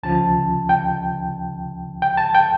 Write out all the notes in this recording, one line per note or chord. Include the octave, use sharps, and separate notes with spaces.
D2 C#3 F3 A5
G5
G5
A5
G5